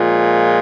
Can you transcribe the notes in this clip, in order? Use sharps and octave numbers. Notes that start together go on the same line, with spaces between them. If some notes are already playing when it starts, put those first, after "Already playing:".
Already playing: A#2 F3 G#3